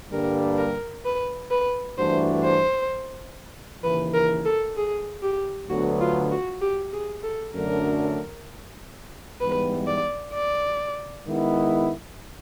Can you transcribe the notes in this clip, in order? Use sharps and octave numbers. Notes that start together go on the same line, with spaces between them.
G2 D3 G3 A#3 D4 A#4
A#4
B4
B4
G2 E3 A3 D4 F#4 C5
C5
D#2 C#3 E3 B4
A#4
A4
G#4
G4
D2 D3 F#3 B3 F#4
F4
F#4
G4
G#4
A4
F#2 D3 F#3 A3 D4 A#4
G#2 E3 G3 B3 B4
D5
D5
D#3 G#3 B3 E4